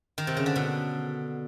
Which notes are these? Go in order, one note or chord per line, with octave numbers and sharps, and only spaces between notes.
D#3
C3
C#3
D3
B2